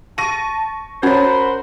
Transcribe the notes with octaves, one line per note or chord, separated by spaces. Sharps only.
A5 C#6 A#6 D#7
C#4 F#4 A#4 C5 C#5 B5